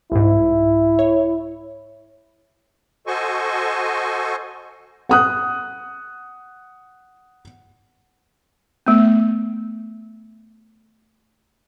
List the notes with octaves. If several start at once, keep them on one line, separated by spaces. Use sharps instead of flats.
C2 G#2 E4
C#5
F#4 A4 C5 D#5 G#5 C#6
F#5 D#6 F#6
A3 B3